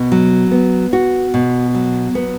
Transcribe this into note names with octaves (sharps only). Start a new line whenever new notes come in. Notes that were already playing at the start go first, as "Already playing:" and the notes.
Already playing: B2
F#3
B3
F#4
B2
F#3
B3